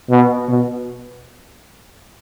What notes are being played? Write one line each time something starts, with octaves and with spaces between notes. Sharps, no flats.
B2
B2